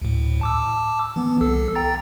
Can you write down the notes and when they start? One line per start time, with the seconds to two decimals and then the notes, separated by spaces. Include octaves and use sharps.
0.01 D2 A2
0.41 A5 D6 E6
1.16 E3 B3
1.41 C2 A4 E6
1.75 G5 A#5 A6